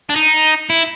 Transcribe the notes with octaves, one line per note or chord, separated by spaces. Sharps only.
D4
D#4
E4